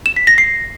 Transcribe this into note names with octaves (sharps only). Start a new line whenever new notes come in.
E7
B6
A#6
C7